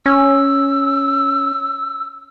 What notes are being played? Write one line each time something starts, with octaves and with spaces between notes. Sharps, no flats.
C#4 E6